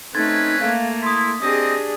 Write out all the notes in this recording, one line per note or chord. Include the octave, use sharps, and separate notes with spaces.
A3 C4 C#4 D#4 B4 C6 G#6 A6
A3 A#3 F5
E4 C6 D#6 B6
C4 D4 G4 G#4 D#5 D#6